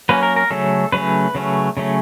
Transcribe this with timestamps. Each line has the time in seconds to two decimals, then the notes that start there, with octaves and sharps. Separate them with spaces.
0.09 F#3 A#3 C#4 B4
0.23 A#4
0.36 A#4
0.50 C#3 F#3 A3 C#4 A4
0.92 C#3 F#3 A3 C#4 B4
1.35 C#3 F#3 A3 C#4
1.77 C#3 F#3 A3 C#4